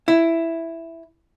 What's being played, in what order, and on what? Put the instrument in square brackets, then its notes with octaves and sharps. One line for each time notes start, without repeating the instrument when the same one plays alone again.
[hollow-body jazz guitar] E4